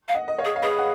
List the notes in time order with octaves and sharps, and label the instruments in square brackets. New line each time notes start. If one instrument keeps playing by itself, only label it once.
[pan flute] F5
[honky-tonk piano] D#5 F#5
D#5
C#5 F5
[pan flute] G#4
[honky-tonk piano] F5
[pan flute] G#4 [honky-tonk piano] B4 D#5
[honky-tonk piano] F#5